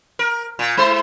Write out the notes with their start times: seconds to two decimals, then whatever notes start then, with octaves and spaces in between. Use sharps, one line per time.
0.19 A#4
0.59 A#2
0.77 G#3 E4 C5